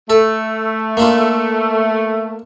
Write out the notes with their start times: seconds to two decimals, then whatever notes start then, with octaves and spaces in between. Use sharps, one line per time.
0.10 A3 A4
0.97 A#3 D4 F4